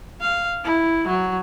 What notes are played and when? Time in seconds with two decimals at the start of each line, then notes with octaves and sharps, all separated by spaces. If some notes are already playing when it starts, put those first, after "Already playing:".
0.21 F5
0.64 E4
1.08 F#3